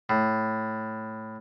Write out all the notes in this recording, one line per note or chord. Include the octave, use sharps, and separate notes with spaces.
A2